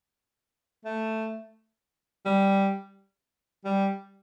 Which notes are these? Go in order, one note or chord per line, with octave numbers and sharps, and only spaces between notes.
A3
G3
G3